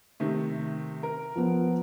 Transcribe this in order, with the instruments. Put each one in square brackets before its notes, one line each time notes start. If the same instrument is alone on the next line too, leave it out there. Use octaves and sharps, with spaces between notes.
[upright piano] C3 D#3 A3
A#4
[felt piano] F3 B3